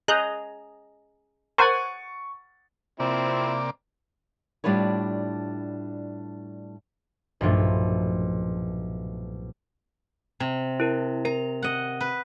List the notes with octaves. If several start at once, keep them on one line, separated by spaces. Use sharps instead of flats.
G#4 D#5 A#5 F#6 G6
A#4 C5 F#5 G#5 C#6 A6
C3 F3 A#3 C4 E4 D5
A2 G3 D4 F4 B4 C#5
B1 G2 A#2 F3 A3
C3
E4 A#4
A#4 A#5
D#5 F#5
B4